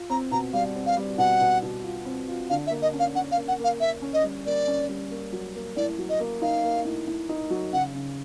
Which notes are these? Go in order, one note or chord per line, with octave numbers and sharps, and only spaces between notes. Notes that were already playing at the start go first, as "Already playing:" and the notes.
Already playing: F4
C4 A#5
B2 A#5
G3 F5
C4
F5
G3
B2 F#5
B2
B2
F4
C4
F4
D3 F5
E5
A#3
D#5
C#4
F5
C#4 F#5
F5
A#3
F#5
A#3 F5
A#3 E5
C#4
D#5
G3
A#3 D5
C#4
G3
A#3
F#3
A#3
A2 D5
F#3
D#5
A#3
D#4 F5
A#3
A2
A2
D#4
F#3
C#3 F#5
C#3